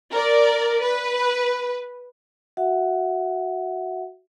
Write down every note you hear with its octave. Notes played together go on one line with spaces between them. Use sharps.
A#4 D5
B4
F#4 E5 F#5